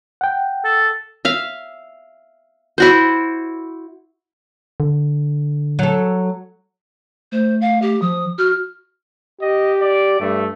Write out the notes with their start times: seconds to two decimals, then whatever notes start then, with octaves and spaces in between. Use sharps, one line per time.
0.21 F#5 G5
0.65 A4
1.25 E5 F5
2.78 E4 F#4 C5
4.80 D3
5.79 F#3 A4
7.32 A3 C5
7.61 F5
7.82 G4
8.02 F3 D#6
8.38 F#4 F6
9.41 G4 D#5
9.81 D5
10.20 G2 A3